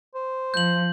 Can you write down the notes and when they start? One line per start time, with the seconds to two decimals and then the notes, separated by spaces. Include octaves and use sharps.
0.14 C5
0.54 F3 G6 F#7